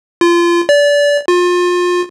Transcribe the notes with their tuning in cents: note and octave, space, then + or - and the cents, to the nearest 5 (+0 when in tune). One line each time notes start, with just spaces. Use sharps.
F4 -25
D5 -25
F4 +30